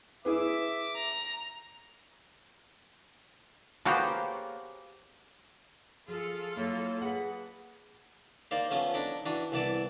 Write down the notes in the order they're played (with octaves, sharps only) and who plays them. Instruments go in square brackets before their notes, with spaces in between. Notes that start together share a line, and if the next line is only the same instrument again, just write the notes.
[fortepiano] E4 G#4 B4 [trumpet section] E5 D6
[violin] A#5
[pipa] C#3 A#3 B3 [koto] F#4 G4 C5
[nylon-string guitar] F3 [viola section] F4 A4 [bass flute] G#4
[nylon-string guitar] F#3 E4 [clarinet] A#3 [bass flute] C#5
[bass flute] G#4 [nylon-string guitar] B4 F#5
[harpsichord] A#3 D#4 C5 D5
F3 A3 B3 C#4
D4 D#4 B5 D6
E3 D4 F#4
C2 E3 B3 D5 A5 D6